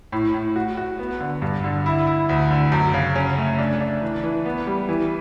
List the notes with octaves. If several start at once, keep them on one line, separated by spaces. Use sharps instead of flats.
A2
A2
F#4
F#4
B3
D3
G2
D3
E4
E4
D2
D3
F#2
C#3
C#4
A3
D4
D4
E3
E3
B3
G3
E3